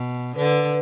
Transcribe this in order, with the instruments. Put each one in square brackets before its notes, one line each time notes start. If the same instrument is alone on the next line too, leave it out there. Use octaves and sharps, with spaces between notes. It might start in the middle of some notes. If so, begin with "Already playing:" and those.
Already playing: [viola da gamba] B2
[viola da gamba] D3 [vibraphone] B4